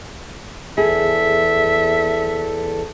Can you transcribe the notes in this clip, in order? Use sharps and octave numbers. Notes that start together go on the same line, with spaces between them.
E2 G#4 A4 E5